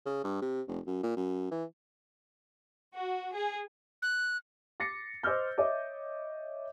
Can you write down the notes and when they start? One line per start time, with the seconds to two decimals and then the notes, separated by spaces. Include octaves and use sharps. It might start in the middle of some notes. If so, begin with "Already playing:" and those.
0.06 C#3
0.24 G2
0.42 C3
0.68 F1
0.87 F#2
1.03 A#2
1.17 F#2
1.51 E3
2.94 F#4
3.35 G#4
4.02 F#6
4.80 D6 A6 A#6 C7 C#7
5.23 C5 D#5 D6 E6 F6 G6
5.58 C#5 D#5 E5 D6